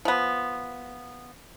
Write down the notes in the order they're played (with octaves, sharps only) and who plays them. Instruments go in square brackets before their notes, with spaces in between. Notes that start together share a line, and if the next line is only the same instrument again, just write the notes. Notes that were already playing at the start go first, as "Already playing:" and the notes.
[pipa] F3 B3